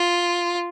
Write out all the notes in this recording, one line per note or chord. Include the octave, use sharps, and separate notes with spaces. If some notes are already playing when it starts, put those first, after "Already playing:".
Already playing: F4